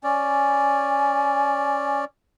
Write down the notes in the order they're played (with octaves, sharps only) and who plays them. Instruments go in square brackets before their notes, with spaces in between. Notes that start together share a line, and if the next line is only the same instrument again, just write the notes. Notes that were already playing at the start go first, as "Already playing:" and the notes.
[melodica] C#4 D5 [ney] G#5